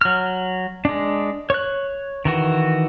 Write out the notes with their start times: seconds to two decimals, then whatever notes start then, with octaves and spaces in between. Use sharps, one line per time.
0.01 F#3 F6
0.85 G#3 D4
1.50 C#5 F#6
2.25 D#3 E3 F#4